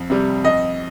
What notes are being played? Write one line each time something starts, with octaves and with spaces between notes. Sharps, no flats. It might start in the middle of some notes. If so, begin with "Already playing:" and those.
Already playing: F2
C3 G3
F2 D#5